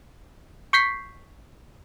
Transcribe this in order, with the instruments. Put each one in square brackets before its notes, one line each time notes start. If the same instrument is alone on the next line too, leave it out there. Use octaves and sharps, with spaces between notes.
[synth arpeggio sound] C#6 G6 B6 C7